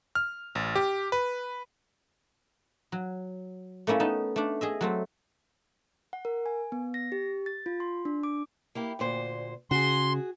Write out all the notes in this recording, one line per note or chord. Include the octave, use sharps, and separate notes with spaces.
F6
A1
G4
B4
F#3
A3 A#3 C#4 E4
B3 D#4 A5
A3 D4
G#4 D#5 E5
F#3 A3 C4
F#5
A#4
G#5
B3
A#6
G4
A6
F4
C6
D4
D6
A#3 E4 G4
D2 A#2 C5
C#3 F#4 G#4 C6